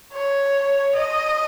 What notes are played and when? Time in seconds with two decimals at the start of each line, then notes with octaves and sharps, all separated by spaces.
0.13 C#5
0.96 D#5